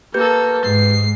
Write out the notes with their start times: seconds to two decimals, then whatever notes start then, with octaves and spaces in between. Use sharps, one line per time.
0.14 A#3 G4 A4 B4 G6
0.65 G#2 C7